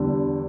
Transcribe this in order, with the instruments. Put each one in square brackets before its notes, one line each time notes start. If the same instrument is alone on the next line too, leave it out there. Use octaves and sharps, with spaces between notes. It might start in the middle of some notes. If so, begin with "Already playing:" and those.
Already playing: [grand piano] E2 D3 G3